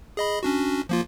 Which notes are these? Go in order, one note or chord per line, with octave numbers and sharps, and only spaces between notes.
G#4 D#5 B5
C#4 D4 F#4
F3 A#3 F4